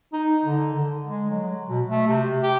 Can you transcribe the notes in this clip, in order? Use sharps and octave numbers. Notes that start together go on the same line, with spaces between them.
D#4
D3
D3
G#3
F#3
B2
A3
C3
G4